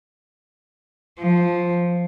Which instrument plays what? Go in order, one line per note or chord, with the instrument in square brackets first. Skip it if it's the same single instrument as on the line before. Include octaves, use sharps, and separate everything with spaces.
[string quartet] F3